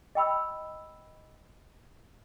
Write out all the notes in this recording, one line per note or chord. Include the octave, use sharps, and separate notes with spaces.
D#5 G5 B5 E6